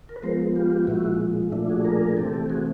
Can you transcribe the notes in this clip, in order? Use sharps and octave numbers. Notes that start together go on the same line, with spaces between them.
A#4
B4
F3 G#3 B3 A#4 C5
F4 G4
A#2 F3 G#3 E4 F#4
A#2 F3 A3 D4 E4
F#4 G#4
G#4 A#4
C3 E3 A3 C4 G4 A4
F#4 G#4